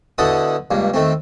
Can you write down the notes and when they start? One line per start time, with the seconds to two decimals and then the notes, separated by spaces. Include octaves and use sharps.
0.18 B2 D3 E4 A4 F#5 D#6
0.71 C#2 G2 A#3
0.94 D#3 A3 C4